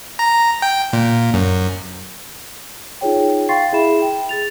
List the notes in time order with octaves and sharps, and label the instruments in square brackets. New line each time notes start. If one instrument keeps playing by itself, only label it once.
[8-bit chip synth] A#5
G5
A#2
F#2
[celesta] D#4 F4 G#4 C#5 G5
F5 G5 C6 C#6 A6 C7
E4 G#4 E5 B5 E7
G5
G#4 A6 F7